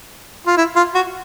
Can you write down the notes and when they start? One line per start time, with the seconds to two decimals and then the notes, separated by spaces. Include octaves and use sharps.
0.47 F4
0.57 E4
0.76 F4
0.95 F#4